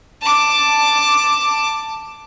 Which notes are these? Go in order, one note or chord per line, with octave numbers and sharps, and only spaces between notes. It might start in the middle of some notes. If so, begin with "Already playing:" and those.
A5 D6